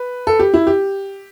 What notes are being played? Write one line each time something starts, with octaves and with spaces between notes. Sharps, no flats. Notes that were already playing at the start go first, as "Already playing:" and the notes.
Already playing: B4
A4
G4
E4
G4